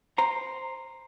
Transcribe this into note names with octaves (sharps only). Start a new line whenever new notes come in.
C5 A#5